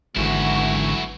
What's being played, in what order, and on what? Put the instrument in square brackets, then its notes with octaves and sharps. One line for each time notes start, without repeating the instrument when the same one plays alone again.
[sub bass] G#1 [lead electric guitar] G#2 D3 [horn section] E3 A3 F#4 [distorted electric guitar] F#3 E4